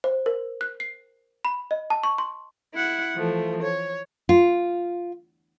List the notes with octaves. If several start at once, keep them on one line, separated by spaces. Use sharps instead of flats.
C5
A#4
F#6
C7
B5
D#5
A5
C#6
C6
E4 F#5
E3 F3 A3
C#5
F4